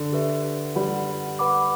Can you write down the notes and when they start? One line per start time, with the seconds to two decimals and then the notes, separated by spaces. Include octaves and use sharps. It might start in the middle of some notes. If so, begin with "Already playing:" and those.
Already playing: D3
0.12 G4 B4 E5
0.76 G3 B4 F#5 B5
1.39 B4 F#5 B5 D6